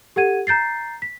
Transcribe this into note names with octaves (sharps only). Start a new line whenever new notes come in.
G4 A4 F#5 G#6 D#7
A#5 G6 A6 C7
B6